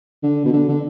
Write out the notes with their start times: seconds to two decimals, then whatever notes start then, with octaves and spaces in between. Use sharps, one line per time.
0.23 D3
0.45 B2
0.53 D3
0.69 D3